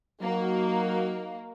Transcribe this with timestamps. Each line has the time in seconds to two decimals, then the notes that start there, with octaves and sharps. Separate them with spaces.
0.22 F#3 A#3 D#4 F#4